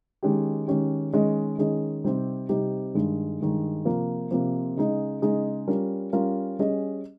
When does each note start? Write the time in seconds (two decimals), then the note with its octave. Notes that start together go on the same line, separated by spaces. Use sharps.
0.23 D#3 G#3 C#4 G4
0.68 D#3 G#3 C#4 G4
1.13 D#3 G#3 C#4 G#4 D#5
1.58 D#3 G#3 C#4 G#4 D#5
2.04 C3 G3 C4 D#4 G4
2.49 C3 G3 C4 D#4 G4
2.94 G2 D#3 G#3
3.41 G2 D#3 G#3
3.85 C3 F3 A#3
4.31 C3 F3 A#3
4.77 C#3 G#3 D#4 G#4 D#5
5.22 C#3 G#3 D#4 G#4 D#5
5.68 G3 C#4 F4 A#4
6.13 G3 C#4 F4 A#4
6.59 G3 C#4 G#4 D#5